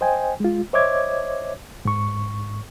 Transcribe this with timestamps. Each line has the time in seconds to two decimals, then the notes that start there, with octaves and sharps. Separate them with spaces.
0.01 C5 D#5 G5 G#5
0.40 G#3 F4
0.73 C5 C#5 D#5 E5 D6 G#6
1.85 G#2 C#6